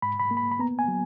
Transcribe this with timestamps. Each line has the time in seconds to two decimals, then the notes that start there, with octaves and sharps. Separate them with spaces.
0.02 G#2 B5
0.20 B5
0.31 A#3
0.37 B5
0.51 B5
0.59 B3 A#5
0.79 G#5
0.88 F#3